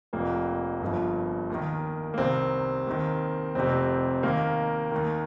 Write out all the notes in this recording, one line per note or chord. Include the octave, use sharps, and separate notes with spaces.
F1 F2 F3 A#3
G1 G2 F3
D#2 D#3
A#3
C2 C3 D#3 C4
D#2 D#3
F1 F2 C3 C4
D#2 D#3 A#3
D#2 D#3